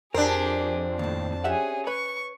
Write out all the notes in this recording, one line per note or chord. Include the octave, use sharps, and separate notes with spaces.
F2 C4 D4 G4 G#4 A#4
D#2 A2 A5
C#4 G4 G#4 E5 F#5
B4 C#5 B5 C#6